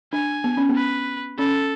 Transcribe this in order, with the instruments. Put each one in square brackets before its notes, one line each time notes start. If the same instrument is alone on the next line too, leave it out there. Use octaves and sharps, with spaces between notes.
[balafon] D4 [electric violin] G#5
[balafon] B3
C#4
B3
[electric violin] B4
[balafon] C#4 [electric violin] A4